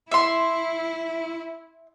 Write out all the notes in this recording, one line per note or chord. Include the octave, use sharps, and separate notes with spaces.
E4 E5 C6